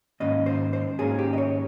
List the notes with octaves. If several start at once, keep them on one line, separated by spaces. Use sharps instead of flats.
G#2 D#3 A#3 C#4 D#5
C5
C5
G#2 D#3 A#3 C#4 G#4
G4
D#5
C#5